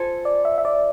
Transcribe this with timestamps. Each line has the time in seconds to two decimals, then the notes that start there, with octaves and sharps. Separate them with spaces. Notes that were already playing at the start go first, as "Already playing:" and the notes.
Already playing: F4 A4 C5 G#5
0.25 D5
0.45 E5
0.58 E5
0.65 D5